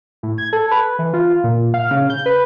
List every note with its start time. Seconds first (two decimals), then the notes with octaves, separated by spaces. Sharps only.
0.23 A2
0.38 G#6
0.53 A4
0.71 B4
0.99 E3
1.14 F4
1.44 A#2
1.74 F5
1.91 C#3
2.10 G6
2.26 B4